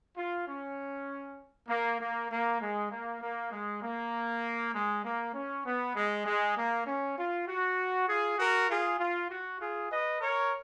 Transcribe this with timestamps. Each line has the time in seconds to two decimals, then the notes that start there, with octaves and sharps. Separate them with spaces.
0.17 F4
0.48 C#4
1.69 A#3
2.00 A#3
2.30 A#3
2.61 G#3
2.91 A#3
3.22 A#3
3.52 G#3
3.82 A#3
4.74 G#3
5.04 A#3
5.34 C#4
5.65 B3
5.95 G#3
6.26 G#3
6.56 A#3
6.86 C#4
7.17 F4
7.47 F#4
8.08 F4 G#4
8.39 F#4 A#4
8.69 F4 G#4
8.99 F4
9.30 F#4
9.60 F4 G#4
9.91 B4 D#5
10.21 A#4 C#5